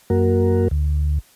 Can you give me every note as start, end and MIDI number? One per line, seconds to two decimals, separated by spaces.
0.10 0.68 42
0.10 0.68 58
0.10 0.68 66
0.10 0.68 70
0.71 1.19 38